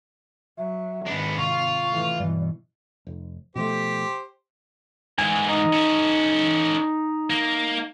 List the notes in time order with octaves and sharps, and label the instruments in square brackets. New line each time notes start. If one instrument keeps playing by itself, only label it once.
[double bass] F#3 [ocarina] E5
[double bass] G#1 [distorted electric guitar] B3 D4
[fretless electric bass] C3 [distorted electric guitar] F4 [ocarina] C#6
[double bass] A2 E3
[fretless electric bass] G2 E3 [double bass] B2 [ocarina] D5
[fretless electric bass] F1
[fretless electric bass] B2 F3 A3 [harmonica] G4 C5
[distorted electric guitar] G#2 E3 [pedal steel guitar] G#5
[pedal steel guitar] D#4
[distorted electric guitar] C#4 A4
A#3